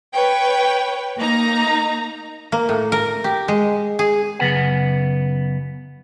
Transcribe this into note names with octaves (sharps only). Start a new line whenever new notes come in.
B4 C#5 G5
A#3 D#4 A#5
A#3
A2
A#4
G4
G#3
G#4
F#2 C#3 B3 F#5